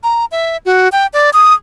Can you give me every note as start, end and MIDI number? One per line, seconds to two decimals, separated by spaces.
0.03 0.25 82
0.32 0.57 76
0.66 0.89 66
0.92 1.07 79
1.13 1.30 74
1.33 1.54 87